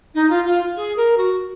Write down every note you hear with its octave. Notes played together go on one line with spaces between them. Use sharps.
D#4
F4
F4
G#4
A#4
F#4